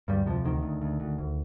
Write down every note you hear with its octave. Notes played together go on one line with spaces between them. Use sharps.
D2 G2 G3
F2 C3 F3
D2 D#3
D2
D2
D2
D2